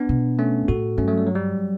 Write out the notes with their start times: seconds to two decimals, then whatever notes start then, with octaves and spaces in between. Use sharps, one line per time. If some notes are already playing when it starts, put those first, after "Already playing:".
Already playing: B3 D4
0.09 B2
0.39 A3 C#4
0.68 A2 F#4 A4
0.98 G2 A3 C#4
1.08 F#3 A3
1.18 G3
1.26 F#3
1.35 G3